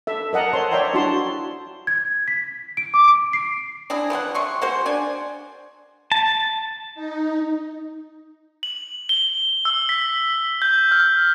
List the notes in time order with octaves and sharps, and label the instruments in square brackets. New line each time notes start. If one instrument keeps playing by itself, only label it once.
[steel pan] A4 E5
A#4 D#5 F#5 A5 A#5
C5 C#5 A5 C6
C#5 D5 E5 G5 A#5 C6
D4 E4 F#4 A5 C6
[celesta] G#6
B6
D7
D6
D7
C7
[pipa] C4 D4 E4 G#4
E3 F3 G3 F#5
C3 C6 C#6
G#3 A#3 F#4 C5
D4 D5 G#5
[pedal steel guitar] A5
[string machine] D#4
[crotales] F#7
G7
E6
B6
G6
F6